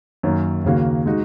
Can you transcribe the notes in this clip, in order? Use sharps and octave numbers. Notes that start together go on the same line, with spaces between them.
F#2 D#3 A#3 C#4
D#2 C#3 A#3 F#4
G#3 D#4 F#4